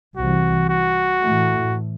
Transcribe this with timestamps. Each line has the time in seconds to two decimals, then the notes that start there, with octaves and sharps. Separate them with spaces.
0.16 C2 C3 E3 F#4
0.69 F#4
1.21 A2 E3 A3